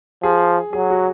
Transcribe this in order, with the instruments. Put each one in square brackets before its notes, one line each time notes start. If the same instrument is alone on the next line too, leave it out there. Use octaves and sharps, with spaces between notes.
[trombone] F3 [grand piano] G#4
[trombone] F#3 [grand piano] G#4
[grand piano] F#4